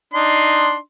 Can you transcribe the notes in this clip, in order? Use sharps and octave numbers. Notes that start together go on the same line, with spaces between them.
D4 D#4 C6